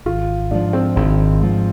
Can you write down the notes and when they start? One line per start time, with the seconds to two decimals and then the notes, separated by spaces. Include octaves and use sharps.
0.06 G#1 F4
0.51 G#2 F3 D4
0.73 C4
0.96 G#1 C4
1.41 G#2 F3